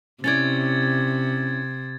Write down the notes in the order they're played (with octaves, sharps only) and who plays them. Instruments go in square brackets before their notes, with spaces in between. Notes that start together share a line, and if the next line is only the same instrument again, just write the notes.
[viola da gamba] C3 [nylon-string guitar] C#4 E4 D5 [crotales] G#6 A6